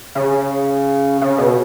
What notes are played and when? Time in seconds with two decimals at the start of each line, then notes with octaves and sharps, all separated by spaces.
0.15 C#3
1.21 C#3
1.38 B2